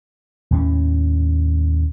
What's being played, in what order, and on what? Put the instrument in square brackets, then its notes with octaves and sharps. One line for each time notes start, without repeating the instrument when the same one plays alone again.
[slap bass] D#2 A2 C#4